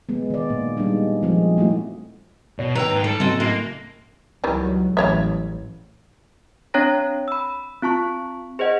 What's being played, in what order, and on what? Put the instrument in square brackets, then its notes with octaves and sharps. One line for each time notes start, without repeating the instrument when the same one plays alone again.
[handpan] G#3 B3
D#3 D5
A#2 A#3
G3 G#3 D4 D#4
F3 G#3 C4
G3 A3 E4 F#4
[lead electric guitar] B2 [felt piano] C#5
[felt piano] D#3 E6 [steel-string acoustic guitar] B4 C#5 G5 [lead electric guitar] A#5
[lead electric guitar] G#2
[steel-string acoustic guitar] G3 [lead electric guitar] A4 [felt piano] D7
[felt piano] C#3 F#3 D#7 [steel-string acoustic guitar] G#3 C4
[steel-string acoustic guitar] A2 G#3 [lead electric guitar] A#3
[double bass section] C#2 F#3 [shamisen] D#3 E3 G3
[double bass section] A1 [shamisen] G3 C#5 E5
[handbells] C4 D4 C#5 G5 A#5 A#6
B5 E6
C4 F4 A5 C#6
G#4 C5 D5 D#5 F#5